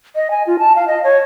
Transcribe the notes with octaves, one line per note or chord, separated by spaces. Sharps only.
D#5
G#5
F4
A5
F5
D#5
C#5